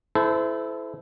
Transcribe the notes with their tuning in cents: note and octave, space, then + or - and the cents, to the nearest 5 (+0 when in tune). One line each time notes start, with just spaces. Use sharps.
E4 +0 A4 -20 C5 -30